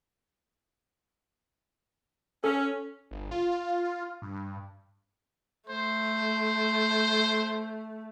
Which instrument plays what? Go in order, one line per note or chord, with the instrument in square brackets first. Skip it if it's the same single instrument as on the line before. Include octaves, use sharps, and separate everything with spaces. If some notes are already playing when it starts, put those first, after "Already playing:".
[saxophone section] C#4 [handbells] A4
[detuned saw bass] G1
F4
G2
[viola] A3 [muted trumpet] C5